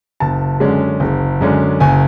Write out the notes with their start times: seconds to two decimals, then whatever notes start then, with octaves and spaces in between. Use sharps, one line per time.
0.20 F#1 A5
0.60 F#2 D3 G#3 C#4
1.00 F#1
1.41 F#2 D3 G#3 C#4
1.80 F#1 G#5